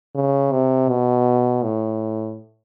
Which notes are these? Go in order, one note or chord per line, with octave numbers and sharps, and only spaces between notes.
C#3
C3
B2
A2